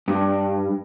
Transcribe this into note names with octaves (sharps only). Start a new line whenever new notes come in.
G2